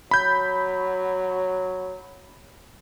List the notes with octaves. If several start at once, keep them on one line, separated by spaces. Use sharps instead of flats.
F#3 B5 G6